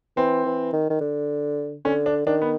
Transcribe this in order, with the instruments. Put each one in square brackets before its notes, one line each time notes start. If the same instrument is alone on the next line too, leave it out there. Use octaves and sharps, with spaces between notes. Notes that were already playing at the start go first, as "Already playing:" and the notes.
[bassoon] E3 [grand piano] C4
[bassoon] E3
D#3
D#3
D3
[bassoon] D3 [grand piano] C#4
[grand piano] D4
[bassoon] D#3 [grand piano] D4
[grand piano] B3